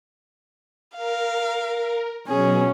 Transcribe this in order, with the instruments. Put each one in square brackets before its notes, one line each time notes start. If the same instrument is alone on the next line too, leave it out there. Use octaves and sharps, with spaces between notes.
[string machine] A#4 [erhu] F5
[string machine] B2 F#3 [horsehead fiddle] C#4 [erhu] G#4